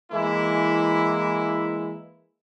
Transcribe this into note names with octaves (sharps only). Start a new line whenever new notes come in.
E3 G#3 A#3 E4